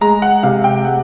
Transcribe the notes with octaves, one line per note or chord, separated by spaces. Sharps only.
G#3 A#5
F#5
C3 F5
G5
G#3 F#5